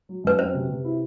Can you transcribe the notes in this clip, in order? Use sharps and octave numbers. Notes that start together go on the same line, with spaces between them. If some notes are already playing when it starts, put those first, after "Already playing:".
F#3
F#2 B4
C4 C5
C3
C3
E4